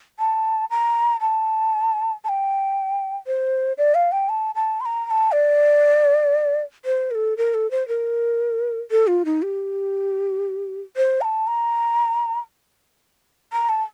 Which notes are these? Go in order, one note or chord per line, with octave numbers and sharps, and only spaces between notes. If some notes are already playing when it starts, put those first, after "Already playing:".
A5
A#5
A5
A5
G5
C5
D5
F5
G5
A5
A5
C6
A#5
A#5
A5
D5
C5
A#4
A4
A#4
A4
C5
A#4
A4
F4
D#4
G4
C5
A#5
A5
A#5
A#5
A5